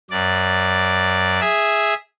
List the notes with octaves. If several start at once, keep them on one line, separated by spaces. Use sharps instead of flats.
F#2 D5
G#4 E5